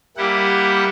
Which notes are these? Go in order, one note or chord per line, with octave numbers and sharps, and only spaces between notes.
G3 A#3 E4 G4 F#5